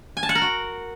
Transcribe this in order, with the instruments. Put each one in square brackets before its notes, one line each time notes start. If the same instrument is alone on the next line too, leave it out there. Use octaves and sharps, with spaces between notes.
[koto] G#5
A5
F#5
A#4
F#4